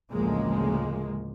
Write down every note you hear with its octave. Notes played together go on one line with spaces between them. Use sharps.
A1 D2 C#3 F3 G#3 A#3